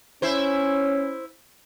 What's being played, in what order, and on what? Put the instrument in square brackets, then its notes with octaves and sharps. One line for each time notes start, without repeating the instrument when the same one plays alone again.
[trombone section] C#4 [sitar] E4 C5